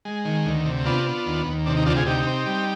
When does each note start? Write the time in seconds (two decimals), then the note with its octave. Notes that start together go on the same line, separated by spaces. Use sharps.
0.05 G#3
0.25 D#3
0.46 D2
0.65 C3
0.86 B3 D4 F4
1.06 B3
1.26 D#2
1.46 D#2
1.66 C3 D4
1.77 D#4
1.86 D2 D4 F4
1.96 F4 G#4
2.06 C3 D#4 G4
2.27 C4
2.46 G3